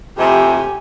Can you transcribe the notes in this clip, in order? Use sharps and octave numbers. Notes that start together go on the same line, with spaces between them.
F2 C3 A3 G4 G#5